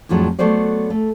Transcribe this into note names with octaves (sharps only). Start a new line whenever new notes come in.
F2 A2 F3 F#3 G#3 D4
F#3 A3 B3 C5 D5
A3